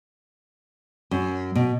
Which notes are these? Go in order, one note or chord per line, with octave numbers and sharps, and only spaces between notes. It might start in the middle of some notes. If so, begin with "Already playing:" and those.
F#2
B2